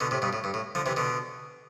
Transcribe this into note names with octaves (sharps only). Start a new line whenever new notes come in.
B2 D3
A2 C3
G2 B2
A2
G2
A2
D3 F3
C3 E3
B2 D3